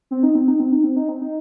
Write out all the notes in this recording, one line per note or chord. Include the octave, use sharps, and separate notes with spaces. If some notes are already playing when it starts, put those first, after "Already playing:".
C4
D#4
C4
D#4
C4
D#4
C4
D#4
C4
D#4